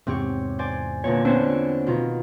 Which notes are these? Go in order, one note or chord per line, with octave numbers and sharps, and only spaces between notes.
E2 G#2 C3 C4 G4 C#5
C5 D5 G#5
E2 A#2 D3 C#5
B3 C4 D4 C5 C#5
B2 D#3 F4